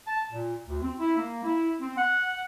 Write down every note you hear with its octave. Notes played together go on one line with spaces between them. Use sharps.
A5
A#2
D2
C4
E4
A#3
E4
C4
F#5